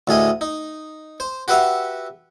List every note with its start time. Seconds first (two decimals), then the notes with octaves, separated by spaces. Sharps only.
0.07 D2 A2 G#4 D#5
0.41 D#4
1.20 C5
1.48 F#4 G4 B4 E5 F#5